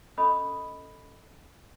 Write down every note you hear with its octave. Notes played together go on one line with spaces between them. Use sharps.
C#4 A4 D#5 B5 D#6